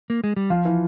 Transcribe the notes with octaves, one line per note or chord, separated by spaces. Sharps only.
A#3
G#3
G3
F3 F4
E3